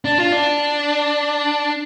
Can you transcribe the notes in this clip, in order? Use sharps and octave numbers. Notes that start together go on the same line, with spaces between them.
D4
F4
D4